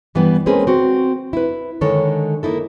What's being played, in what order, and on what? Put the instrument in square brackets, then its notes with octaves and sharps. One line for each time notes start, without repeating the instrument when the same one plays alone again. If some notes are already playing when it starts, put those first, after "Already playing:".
[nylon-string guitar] G2 E3 G3 B3 D4
G#3 A#3 C4 C#4 G#4 B4
C4 F#4
E4 B4
D3 D#3 G#3 A4 C#5
A#3 D#4 E4 A4